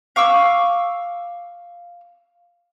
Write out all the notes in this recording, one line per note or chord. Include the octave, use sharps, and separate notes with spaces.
F5 C#6 D6 E6